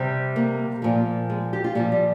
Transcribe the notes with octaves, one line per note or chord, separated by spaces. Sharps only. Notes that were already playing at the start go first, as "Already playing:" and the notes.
Already playing: C3 G3
A#3
A#2 F3
G#3
G4
F4
A#2 F3 G3
G3